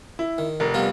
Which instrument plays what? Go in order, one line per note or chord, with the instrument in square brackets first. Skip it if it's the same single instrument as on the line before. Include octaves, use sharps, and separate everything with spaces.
[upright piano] E4
[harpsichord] D#3
[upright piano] F1 A#4
[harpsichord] G3 B3 F4